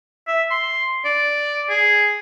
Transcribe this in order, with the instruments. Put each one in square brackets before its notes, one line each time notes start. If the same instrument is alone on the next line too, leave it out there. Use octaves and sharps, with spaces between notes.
[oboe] E5
C6
D5
G#4